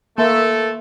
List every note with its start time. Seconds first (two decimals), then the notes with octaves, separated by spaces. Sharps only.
0.18 A3 A#3 A4 E5 A5 C6